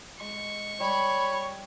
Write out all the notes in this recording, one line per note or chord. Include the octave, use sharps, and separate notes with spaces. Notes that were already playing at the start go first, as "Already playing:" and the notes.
G#3 C#6
G3 C#5 B5